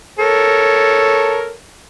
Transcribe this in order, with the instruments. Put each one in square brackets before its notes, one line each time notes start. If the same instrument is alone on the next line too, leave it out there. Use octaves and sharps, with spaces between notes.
[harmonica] A4 A#4 C#5